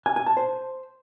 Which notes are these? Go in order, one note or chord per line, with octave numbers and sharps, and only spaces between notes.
G#5
G#5
A5
C5